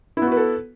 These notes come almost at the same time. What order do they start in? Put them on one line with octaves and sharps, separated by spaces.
E4 B3 F#4 B4 A4